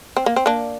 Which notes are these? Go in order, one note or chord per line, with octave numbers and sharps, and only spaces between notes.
C4
A#3
C4
A#3 D4